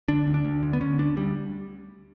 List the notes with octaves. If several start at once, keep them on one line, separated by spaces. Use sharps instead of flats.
D3 D4
D2
D4
D2
D3
B3
D3 C#4
D2 D4
D2 G3